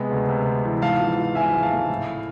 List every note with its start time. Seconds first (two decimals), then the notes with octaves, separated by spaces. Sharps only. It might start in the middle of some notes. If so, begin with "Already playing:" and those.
Already playing: C3 G#3 B3
0.11 D2
0.29 C3
0.46 B3
0.65 E3
0.82 G#2 F5 A5
1.00 F3
1.18 F3
1.35 G#1 E5 G#5
1.54 G#2
1.63 F5 A5
1.72 A3
1.89 A2